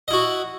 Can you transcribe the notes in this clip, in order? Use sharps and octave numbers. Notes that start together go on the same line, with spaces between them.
E4 F#4 D#5